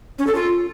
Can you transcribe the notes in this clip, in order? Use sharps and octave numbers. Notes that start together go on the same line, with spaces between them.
C#4
A4
F4